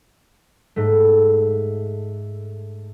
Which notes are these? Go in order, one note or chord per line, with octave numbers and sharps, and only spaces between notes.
G#2 A3